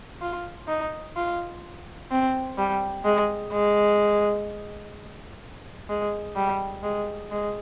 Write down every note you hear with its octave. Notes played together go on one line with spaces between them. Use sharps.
F4
D#4
F4
C4
G3
G#3
G#3
G#3
G3
G#3
G#3